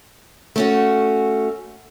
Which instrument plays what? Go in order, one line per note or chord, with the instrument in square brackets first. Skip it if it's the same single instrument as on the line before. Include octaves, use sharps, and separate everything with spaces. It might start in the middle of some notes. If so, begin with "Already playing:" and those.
[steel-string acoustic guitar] A3 C#4 F#4